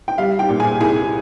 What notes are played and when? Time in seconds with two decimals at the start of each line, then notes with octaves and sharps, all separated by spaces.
0.08 G5
0.18 G3 F5
0.39 G4 G5
0.49 A#2
0.60 G#4 G#5
0.81 C2 G#4 G#5